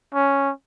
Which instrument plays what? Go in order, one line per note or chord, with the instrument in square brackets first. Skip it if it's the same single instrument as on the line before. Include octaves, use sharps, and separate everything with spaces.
[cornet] C#4